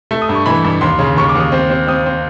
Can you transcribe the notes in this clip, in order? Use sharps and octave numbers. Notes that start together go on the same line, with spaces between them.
A3
D#6
G2
C#6
E3 B5
G2
D#2 C6
C#3
D#2 C#6
D6
D#2 D#6
C4
C4
C4 D#6
C4